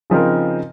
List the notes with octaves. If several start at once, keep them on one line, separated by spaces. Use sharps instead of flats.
C#3 F3 C4 D#4 A#4